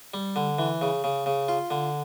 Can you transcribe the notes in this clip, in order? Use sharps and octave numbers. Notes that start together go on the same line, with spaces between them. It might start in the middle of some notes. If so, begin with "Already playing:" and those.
G3
D3
E3
C#3
C#3
C#3
F4
D3